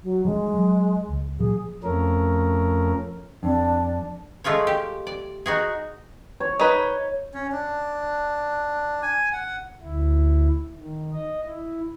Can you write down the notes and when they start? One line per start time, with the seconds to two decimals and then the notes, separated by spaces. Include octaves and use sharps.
0.03 F#3
0.25 F3 G3 G#3 D4
0.54 F#3
1.09 C#2
1.39 A#2 F3 F#3 G#4
1.83 F2 F3 A3 C#4 A#4
3.43 F2 D4
4.44 G#3 A3 F4 G#4 C#5
4.67 G4
5.07 D5
5.46 D#4 F#4 G#4
6.40 C#5
6.60 D#4 B4
7.34 C#4
7.52 D4
9.03 G#5
9.33 F#5
9.82 D2 E4
10.78 D#3
11.13 D#5
11.45 E4